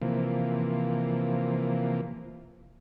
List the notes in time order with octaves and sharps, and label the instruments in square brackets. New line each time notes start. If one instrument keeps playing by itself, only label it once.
[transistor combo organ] C3 E3 F3 A#3